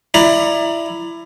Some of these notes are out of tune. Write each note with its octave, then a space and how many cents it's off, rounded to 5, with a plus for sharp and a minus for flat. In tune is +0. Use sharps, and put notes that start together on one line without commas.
E4 +20 D5 +25 A#5 +15